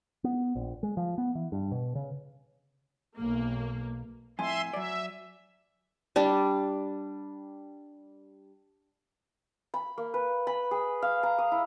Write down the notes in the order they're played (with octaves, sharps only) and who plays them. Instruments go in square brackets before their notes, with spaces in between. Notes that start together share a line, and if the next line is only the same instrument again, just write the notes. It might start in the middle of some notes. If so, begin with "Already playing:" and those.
[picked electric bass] B3
A#1
G#3
F3
B3
E3
G2
B2
C#3
[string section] B1 A#3
[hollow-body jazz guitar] F2 A2 [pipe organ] E5 C6 [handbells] G#5
[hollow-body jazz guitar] F#3 D5 [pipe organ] E5
[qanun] G3 D4
[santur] B5
A#3
B4
B5
G#4
F5
A#5
D#6
E4